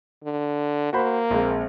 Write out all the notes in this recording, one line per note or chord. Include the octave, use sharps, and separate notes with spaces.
D3
A#3 F#4 C5 B5
A#1 G#3 C4